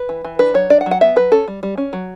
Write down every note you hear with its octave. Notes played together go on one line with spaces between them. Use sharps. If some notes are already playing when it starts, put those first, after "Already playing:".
Already playing: B4
E3
E3
D4 B4
F#3 C#5
D4 D5
F#5
F#3
F#5
B3 E5
F#3 B4
C#4 A4
G3
G3
C#4
F#3